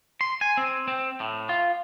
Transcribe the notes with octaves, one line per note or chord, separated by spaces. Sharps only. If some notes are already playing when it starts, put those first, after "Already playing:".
C6
G#5
C4
C4
A2
F4